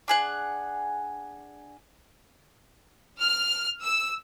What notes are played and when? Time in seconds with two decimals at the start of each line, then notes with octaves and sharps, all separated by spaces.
0.08 D4 G#4 F#5
3.19 F6
3.83 E6